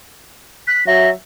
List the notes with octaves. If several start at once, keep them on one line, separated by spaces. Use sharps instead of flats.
F#6 B6
F#3 E5 A#6